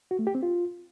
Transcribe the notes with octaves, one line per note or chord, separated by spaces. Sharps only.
F#4
A3
G4
C4
F4